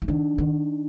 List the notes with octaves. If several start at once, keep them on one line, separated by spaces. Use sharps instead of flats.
E3
D#3 D4
D#3